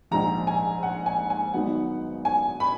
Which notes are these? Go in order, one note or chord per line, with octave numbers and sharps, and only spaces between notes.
A#1 G#2 F3 A#5
G#5
F#5
G#5
G#5
G#1 G#2 F#3 B3 D#4 F#5
G#5
B5